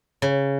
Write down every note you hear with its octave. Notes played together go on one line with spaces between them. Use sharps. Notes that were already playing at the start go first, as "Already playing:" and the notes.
C#3